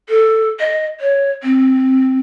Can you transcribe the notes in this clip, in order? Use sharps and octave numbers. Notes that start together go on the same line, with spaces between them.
A4
D#5
C#5
C4